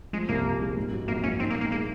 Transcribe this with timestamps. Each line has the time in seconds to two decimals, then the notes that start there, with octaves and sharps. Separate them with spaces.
0.13 F3 G#3
0.29 C2 A#3
0.44 A#2
0.60 G#3
0.77 G#2
0.92 F#3
1.08 A#1 A#3
1.24 A#1 C#4
1.40 C4 D#4
1.50 A#3
1.56 D#4
1.61 A#3
1.71 G#3 A#3